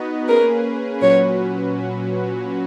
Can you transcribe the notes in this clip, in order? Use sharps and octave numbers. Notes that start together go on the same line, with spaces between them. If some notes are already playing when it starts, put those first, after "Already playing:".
Already playing: B3 D#4 F#4 B4 D#5
A#3 C#4 G#4 A#4 B4
A#2 F#3 C#4 F#4 B4 C#5